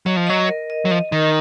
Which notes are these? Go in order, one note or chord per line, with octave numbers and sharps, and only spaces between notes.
F#3 D#5
F3
F#3 D#5
A#4
D#5
F#3
F3 D#5
D#3 A#4